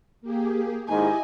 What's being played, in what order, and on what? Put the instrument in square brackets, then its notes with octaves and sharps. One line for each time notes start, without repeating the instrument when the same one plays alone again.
[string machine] A#3 G4 G#4
[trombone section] G#2 D#3 G#3 [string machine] E4 G4 D#5 [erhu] G#5